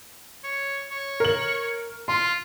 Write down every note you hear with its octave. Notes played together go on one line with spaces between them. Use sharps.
C#5
C#5
A#4 F#7
F4 C6